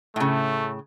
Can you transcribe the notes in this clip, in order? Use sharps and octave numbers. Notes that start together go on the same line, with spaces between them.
A2 C#3 A3